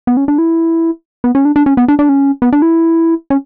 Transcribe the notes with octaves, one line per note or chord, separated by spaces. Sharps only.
B3
C#4
D4
E4
B3
C#4
D4
D4
C#4
B3
D4
D4
C#4
B3
D4
E4
C#4